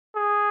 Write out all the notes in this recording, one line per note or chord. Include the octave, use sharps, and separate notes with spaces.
G#4